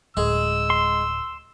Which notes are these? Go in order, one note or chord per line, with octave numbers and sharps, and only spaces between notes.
D1 G#3 E6
C6